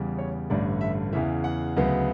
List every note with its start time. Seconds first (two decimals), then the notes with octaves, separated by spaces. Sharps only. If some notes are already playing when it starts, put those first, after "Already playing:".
Already playing: E2 C#3 G3
0.18 C#5
0.50 A1 G2 D3 A3 D5
0.81 E5
1.13 E2 C#3 E3 E5
1.44 F#5
1.76 D2 C#3 F#3 B3